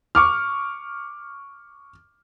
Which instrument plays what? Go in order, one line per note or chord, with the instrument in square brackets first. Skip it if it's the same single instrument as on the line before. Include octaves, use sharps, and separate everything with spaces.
[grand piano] C#6 D6 F6